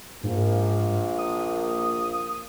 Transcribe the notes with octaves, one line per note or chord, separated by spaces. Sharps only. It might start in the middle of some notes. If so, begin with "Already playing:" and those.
A#1 G#2 A#3
D#6